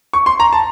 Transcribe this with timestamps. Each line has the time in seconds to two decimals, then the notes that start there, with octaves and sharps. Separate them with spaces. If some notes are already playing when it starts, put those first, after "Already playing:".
0.13 C#6
0.26 C6
0.40 A#5
0.53 A5